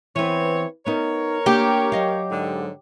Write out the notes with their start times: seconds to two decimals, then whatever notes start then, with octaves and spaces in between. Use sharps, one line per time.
0.16 E3 B3 C4 B4 C#5
0.86 B3 D#4 A#4 C#5
1.46 A#3 D4 G4
1.92 F#3 D#5 F5
2.30 G#2 D3